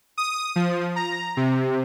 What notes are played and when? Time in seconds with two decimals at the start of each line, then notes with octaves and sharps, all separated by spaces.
0.18 D#6
0.56 F3
0.96 A#5
1.37 C3